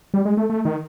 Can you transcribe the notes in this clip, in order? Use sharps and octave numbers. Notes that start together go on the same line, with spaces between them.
G3
G#3
A3
A3
D#3